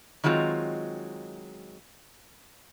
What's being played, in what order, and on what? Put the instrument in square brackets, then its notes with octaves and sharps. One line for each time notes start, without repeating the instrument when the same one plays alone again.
[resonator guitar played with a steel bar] D#3 F#3 G#3 C4 F4